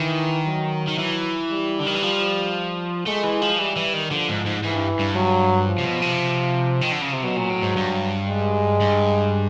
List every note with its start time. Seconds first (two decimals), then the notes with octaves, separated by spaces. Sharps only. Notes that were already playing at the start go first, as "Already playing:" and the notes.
Already playing: D#3 E3
0.46 F#3
0.87 D#3
0.99 E3
1.51 G3
1.79 D3
1.86 D#3
1.95 E3
2.02 F3
3.06 G#3 A3
3.24 E3
3.42 F3
3.59 E3 G3
3.76 E3
3.93 D#3
4.11 D3 F3
4.28 G#2
4.46 G#2
4.63 G#2 E3
4.75 G2
4.99 G2
5.15 F#3
5.67 F3
5.78 C3
5.85 B2
6.02 C3
6.82 D#3
6.92 D3
7.02 C#3
7.13 C3
7.24 B2 F#3
7.37 A#2
7.50 A2
7.63 G#2
7.76 G2
8.28 G#3
8.80 G2